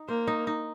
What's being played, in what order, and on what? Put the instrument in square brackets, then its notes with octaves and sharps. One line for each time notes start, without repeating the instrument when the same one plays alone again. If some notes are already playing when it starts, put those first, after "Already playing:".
Already playing: [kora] D#4
[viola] A#3 [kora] C5
[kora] D#4
D#4